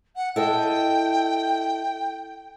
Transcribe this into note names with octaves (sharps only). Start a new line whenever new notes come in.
F#5
E4 A4 D#5 G5